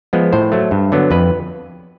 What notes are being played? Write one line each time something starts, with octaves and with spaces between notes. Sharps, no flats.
F3 G#3 B3
A2 C5
F#3 A3
G2
D3 F#3 B3
F2 B4